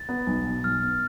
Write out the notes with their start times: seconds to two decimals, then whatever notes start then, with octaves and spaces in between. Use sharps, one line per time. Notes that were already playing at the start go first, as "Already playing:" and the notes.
Already playing: A6
0.09 B3
0.27 B1
0.46 B2
0.64 B1 F6
0.82 B3